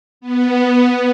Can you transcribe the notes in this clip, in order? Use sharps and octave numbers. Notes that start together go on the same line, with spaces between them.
B3